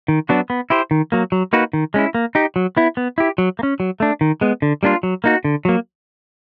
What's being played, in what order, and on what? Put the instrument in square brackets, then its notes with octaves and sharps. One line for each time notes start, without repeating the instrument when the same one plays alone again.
[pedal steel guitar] D#3
F#3 B3 D4 F#4
B3
E4 G4 C5
D#3
F#3 A#3
F#3
A#3 D#4 F#4 B4
D#3
G#3 C#4 E4
A#3
D#4 G4
F#3
B3 E4
B3
E4 G4
F#3
A#3
C#4
F#3
A3 D4
D#3
G#3 B3
D3
G3 A#3 D4 F4
F#3
A#3 D#4 F#4
D3
F#3 A#3